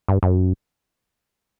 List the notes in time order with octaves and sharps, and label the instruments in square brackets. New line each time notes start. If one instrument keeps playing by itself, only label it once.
[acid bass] G2
F#2